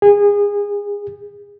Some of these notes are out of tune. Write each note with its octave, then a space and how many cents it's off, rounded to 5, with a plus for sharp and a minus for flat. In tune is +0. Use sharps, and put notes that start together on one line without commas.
G#4 -25